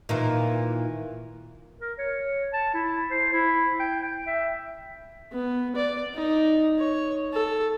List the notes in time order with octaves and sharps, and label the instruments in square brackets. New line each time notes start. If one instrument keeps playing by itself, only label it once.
[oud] A#2 D#3 E3
[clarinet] A#4
C#5
A5
E4
C5
E4
G5
G5
E5
[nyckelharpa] B3
D5
D#4
C#5
A4